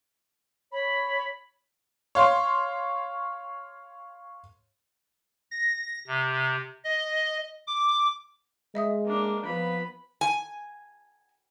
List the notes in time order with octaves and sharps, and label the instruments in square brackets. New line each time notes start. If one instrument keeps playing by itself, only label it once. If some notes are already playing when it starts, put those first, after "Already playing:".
[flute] C#5 [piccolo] B5
[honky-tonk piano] C#5 F5 C6
[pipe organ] A#6
C3
D#5
D6
[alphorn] G#3 [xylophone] D#5 E5 D#6
[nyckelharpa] A#3 D4
[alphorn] F3 [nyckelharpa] B3 B5
[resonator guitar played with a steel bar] G#5